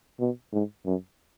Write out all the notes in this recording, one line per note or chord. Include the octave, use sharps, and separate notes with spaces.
B2
G#2
F#2